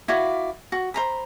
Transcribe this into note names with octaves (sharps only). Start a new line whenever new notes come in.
E4 F#4 D5 F5
F#4
C5 A#5 B5